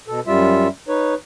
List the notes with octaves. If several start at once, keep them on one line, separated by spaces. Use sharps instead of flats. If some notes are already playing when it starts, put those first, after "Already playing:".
B2 A4
F#2 G3 F4 E5
D#4 B4 C#5